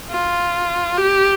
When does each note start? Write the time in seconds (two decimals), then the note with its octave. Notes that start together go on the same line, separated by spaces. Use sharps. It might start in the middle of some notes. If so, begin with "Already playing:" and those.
0.10 F4
0.98 G4